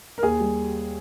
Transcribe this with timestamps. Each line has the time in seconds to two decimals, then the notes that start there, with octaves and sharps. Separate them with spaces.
0.18 A#4
0.23 D#2 G#4
0.40 G3